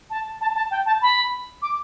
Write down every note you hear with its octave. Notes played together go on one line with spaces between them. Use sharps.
A5
A5
A5
G5
A5
B5
D6